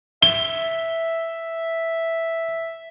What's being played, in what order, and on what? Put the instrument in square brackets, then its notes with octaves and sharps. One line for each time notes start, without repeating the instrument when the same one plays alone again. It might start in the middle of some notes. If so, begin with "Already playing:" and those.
[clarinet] E5 [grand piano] G7